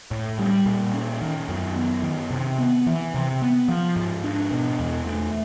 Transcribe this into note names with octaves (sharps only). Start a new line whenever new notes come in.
A2
G3
A#2
C#4
D#3
F#2
B3
D#3
C3
B3
E3
C3
B3
F3
G#2
D4
B2
E2
A3